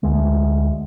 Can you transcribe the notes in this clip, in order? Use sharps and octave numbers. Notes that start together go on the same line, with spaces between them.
D2 G#3